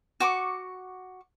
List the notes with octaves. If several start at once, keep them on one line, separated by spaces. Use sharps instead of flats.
F#4 C#6 D6